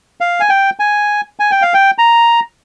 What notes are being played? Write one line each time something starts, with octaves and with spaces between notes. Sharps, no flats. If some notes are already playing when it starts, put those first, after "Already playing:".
F5
G#5
G5
G#5
G#5
G5
F5
G5
A#5